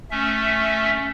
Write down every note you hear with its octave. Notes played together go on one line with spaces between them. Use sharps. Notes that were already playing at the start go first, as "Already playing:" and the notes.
A3 C#4 E5